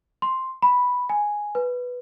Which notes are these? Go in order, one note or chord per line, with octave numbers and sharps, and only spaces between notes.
C6
B5
G#5
B4